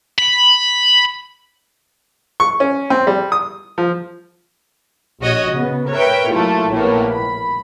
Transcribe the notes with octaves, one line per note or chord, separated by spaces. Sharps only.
B5
C#6
C#4
C4
G3
D#6
F3
A#1 F#4 C#5 D#5
C#3 B3
A#4 B4 C#5 E5 G5
F#3 A3 A#3 E4 F4
A#1 A2 A#3 B3 C#5
B5